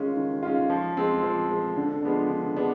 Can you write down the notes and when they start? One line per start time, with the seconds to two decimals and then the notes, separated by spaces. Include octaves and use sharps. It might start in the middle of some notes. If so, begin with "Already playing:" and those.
Already playing: D#3 G#3 C#4 F4
0.17 D#3
0.43 G#3 C#4 F4
0.70 F3
0.97 G#3 C4
1.23 F3
1.50 G#3 C4
1.77 D3
2.03 F3 G#3 B3 D4
2.30 D3
2.56 G#3 B3 D4